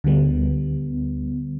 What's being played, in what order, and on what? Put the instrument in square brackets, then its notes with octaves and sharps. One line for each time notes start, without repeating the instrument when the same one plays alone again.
[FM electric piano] D2 D3 G3 B3